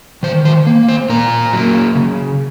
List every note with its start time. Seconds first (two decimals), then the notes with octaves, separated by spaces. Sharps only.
0.23 D#3 C5
0.45 C5
0.67 A#3
0.88 C5
1.09 A#2 A#4
1.53 F#3 A#3
1.95 C#3